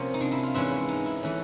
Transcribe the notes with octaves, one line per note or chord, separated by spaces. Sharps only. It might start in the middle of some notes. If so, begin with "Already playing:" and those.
Already playing: C3 F3 A#3 C#4
D#4
D4
E4
F4
G#2 E3 G#3 C#4 E4
D#4
E4
E3 A3 C#4